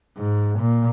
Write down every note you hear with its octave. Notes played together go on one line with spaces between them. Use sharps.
G#2
A#2